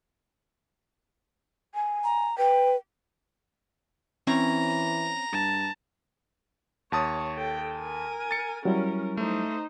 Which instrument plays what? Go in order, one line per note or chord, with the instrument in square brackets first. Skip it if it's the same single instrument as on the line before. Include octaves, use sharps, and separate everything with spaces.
[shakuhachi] G#5
[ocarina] A#5
[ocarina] B4 [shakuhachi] G5
[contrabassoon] E3 [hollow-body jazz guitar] C4 C#4 C#5 [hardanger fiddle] A#5
[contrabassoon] G2 [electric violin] A5
[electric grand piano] D#2 A5 D#6 [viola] C#5
[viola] A4 G5
A#4 G#5
[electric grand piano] A6 C#7
[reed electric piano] F#3 G3 E4 [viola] C#4 A#4
[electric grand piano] A3 [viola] D#4 C5